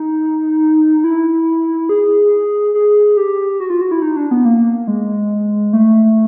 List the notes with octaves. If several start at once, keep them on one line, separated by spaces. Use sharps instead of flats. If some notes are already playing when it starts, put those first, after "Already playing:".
Already playing: D#4
E4
G#4
G#4
G4
F#4
F4
F#4
E4
D#4
D4
B3
A#3
G#3
A3